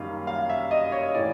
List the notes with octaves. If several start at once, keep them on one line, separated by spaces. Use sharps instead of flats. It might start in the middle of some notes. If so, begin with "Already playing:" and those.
Already playing: F#2 D#3 G3 A#3 F5
F5
E5
D#5
C#5
A2 E3 D5